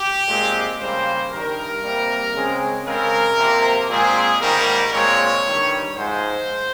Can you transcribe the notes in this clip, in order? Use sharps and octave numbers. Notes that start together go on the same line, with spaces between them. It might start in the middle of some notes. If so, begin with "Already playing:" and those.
Already playing: G4
A#2 G#3 C4
C#3 G3 A#3 C5
G2 D#3 G3 A#4
C3 G3 A#3
C#3 G#3 C4
C#3 G#3 C4 A#4
C3 F3 A#3
A#2 G#3 C4 G#4
G#2 D#3 G3 A#3 A#4
A#2 G#3 C4 C#5
G2 D#3 G3
G#2 F3 G#3 C5